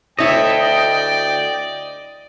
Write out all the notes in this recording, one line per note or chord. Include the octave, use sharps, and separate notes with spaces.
D2 E4 A4 C#5 D#5 E5 G5
D5